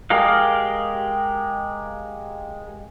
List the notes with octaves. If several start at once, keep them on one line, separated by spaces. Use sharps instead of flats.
G#3 G4 A#4 D#5 F5